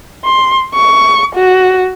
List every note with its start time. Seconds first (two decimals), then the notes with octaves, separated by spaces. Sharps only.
0.24 C6
0.74 C#6
1.35 F#4